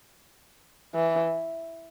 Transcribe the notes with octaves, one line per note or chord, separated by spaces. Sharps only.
E3